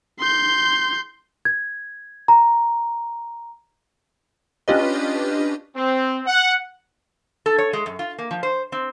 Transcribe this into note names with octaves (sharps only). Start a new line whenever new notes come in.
C6 G6
G#6
A#5
C#4 D4 F4 G4 B4 D#5
C4
F#5
A4
C#5
G#3
F#2
F4
A#3
F3
C5
C4